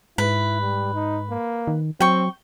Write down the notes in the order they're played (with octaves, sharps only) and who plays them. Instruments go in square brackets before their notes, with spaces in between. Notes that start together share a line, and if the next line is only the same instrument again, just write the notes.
[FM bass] G#2 [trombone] E4 [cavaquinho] B4
[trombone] G3
D#4
A#3
[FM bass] D#3
[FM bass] F#3 [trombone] C4 [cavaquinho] G5 C#6